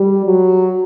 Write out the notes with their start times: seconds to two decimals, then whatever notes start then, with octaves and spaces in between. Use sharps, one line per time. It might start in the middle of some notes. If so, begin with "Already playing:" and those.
Already playing: G3
0.25 F#3